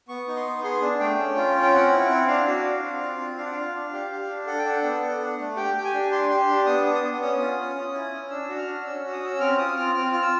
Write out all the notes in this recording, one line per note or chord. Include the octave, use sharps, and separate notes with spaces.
B3 C#6
D#4
C6
B3
G#4 C6
D4
A3 G5
C#4
F4
C#4
G5
C4 F#5
E4
C4
D4 F5
F#4
D4
C4
F4
C4
D4 F5
F#5
F4 F5
D4
G4
G4
D4
A4 F#5
G5
D4 F#5
B3
A4
D4
A3
G4 G5
G4
G#5
D4
G4 C6
G4
D4
B3 D#6
D4
D#6
B3
C#4 D#6
F4
C#4
C#4
E4
C#4
D4 E6
F#4
F6
D4
C#4 E6
E6
F#4
D#6
C#4 E6
C4 F6
F4 D#6
C4 F6
C4 F6
F4 F6
E6